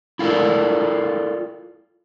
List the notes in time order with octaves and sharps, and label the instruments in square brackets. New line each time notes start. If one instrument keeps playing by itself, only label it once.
[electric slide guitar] E4 F4 A4 A#4 D5